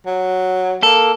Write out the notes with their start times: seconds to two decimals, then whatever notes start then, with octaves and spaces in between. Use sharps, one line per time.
0.06 F#3
0.83 A#3 A4